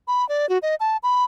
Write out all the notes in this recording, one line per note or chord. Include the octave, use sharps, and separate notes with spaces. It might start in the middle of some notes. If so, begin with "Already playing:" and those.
B5
D5
F#4
D#5
A5
B5